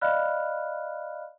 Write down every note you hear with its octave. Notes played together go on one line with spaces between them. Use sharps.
D5 D#5 F5 B5 F6 F#6